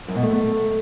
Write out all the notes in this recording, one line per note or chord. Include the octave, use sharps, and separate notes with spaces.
F#2
B2
A3